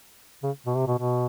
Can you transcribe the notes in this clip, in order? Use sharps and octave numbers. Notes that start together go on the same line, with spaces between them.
C#3
B2
C3
B2
B2